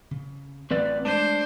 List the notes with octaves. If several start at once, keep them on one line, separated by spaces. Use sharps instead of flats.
C#3
A1 C4 B4 D5
G#3 A3 D4 C5